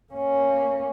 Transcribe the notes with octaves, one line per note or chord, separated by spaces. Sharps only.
A#3 C#4